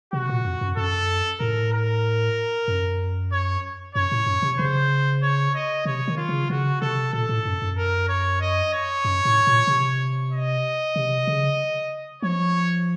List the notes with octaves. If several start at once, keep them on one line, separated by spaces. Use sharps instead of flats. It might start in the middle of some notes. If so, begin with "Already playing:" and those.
C3 F#4
A#2
F2
F#2
F#2 A4
A2 A#4
A#4
F#2
C#5
F#2 C#5
A2
F#2
C3
C#3 C5
C#5
D#5
C3 C#5
D#3
F4
C#3
C#3 F#4
C3 A4
A#2 A4
A2
F#2
F#2
A#4
C#5
D#5
C#5
F#2
A2
A#2
C3
D#5
C3
C#3
F3 C#5